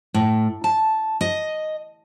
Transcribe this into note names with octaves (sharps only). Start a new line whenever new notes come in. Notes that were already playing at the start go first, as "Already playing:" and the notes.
A2
A5
D#5